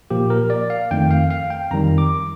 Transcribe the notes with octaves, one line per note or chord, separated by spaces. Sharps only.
A#2 F3 A#3 G4
A#4
D5
F5
F2 D#3 A3 G5
F5
F5
G5
F2 D#3 G3 A#5
D6